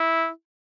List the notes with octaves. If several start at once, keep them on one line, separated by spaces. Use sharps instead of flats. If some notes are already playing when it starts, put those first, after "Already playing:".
Already playing: E4